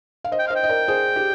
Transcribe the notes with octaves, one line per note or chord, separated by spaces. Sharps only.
F5
C5 D#5
G5
C5 D#5 F5
G5
D#5
A#4 D5
G#4 C5
G4